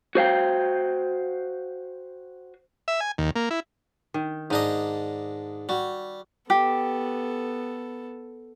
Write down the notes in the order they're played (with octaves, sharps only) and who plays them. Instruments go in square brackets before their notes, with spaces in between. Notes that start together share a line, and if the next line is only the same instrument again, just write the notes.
[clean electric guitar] F#4 C5 F5 G5
[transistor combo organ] E5
G#5
D#2
A#3
E4
[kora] D#3
[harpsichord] G#2 D4 D#5 [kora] D#4
[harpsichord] G3 [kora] F#4
[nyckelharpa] B3 A4 [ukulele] G4